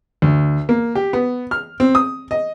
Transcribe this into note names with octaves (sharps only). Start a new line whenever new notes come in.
D2
A#3
G4
B3
F6
C4
D#6
D#5